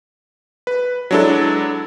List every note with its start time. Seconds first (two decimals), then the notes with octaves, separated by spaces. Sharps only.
0.67 B4
1.11 F#3 G#3 D4 E4 A4